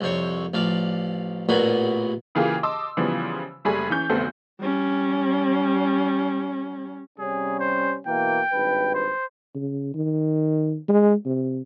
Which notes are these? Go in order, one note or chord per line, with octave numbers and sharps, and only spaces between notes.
C2 F2 C4 C#5
A1 F3 D5 F5
A1 D#2 A#2 B3 F#4 G#4
C#3 E3 A#3 F4 G4 G#4
D#5 A5 C6 D6 E6
C#3 E3 F3 G3 B3 C5
F#1 G3 A3 G#4 G#5 B5
E3 C#4 G6
F1 D2 B3 C4 A4
G3 C#4
C3 G3 C#4 G#4
C5
B2 E3 A#3 G5
G#1 G2 B4
C5
C#3
D#3
G#3
C3